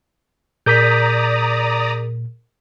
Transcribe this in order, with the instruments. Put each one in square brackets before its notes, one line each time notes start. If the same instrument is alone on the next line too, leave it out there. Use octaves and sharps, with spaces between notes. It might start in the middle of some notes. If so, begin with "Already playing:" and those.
[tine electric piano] A#2 [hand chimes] G#4 A#4 [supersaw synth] D5 A#5 D#6 [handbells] G6 B6